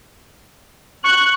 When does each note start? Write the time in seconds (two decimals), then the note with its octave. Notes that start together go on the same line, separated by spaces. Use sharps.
1.04 C#6 F#6